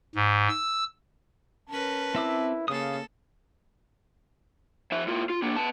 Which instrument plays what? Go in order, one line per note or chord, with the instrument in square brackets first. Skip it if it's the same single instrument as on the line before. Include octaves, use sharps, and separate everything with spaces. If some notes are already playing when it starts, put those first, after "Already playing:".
[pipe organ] G#2
E6
[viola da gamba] C#4 A#4 B4 [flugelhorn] A5
[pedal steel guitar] C4 E5 D6 [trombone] E4
[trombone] C#3 [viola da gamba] A#3 A4 [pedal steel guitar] F5 D#6
[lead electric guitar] F3 E5
A2 F4
F4
A#3 D4
B3 A5